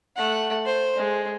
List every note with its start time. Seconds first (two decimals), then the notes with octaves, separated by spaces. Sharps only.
0.16 A3 F#5
0.66 C5
0.96 G#3